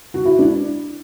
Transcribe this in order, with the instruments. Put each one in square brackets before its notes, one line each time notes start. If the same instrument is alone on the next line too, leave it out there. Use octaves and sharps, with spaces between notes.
[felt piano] F#4
E4
D4